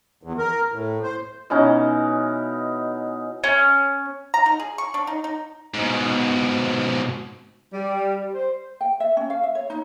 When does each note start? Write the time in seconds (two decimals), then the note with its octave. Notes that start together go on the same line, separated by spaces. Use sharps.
0.23 E2
0.38 A#4
0.72 A2
1.03 C5
1.50 B2 E3 C#4 D#4
3.44 C#4
4.34 A#5
4.46 D#4
4.60 G#4
4.78 C#6
4.94 D4
5.07 D#4
5.24 D#4
5.74 G#2 B2
7.73 G3
8.32 C5
8.81 G5
9.00 E5
9.17 C#4
9.30 F5
9.43 E5
9.55 C#5
9.70 D#4